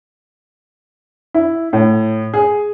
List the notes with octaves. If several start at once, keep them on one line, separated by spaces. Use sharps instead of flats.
E4
A2
G#4